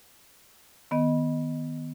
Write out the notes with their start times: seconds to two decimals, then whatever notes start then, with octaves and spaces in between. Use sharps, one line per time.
0.91 D#3 B3 D#5